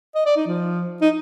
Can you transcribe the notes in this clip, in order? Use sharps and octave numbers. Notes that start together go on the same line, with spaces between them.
D#5
D5
D#4
F3
D#4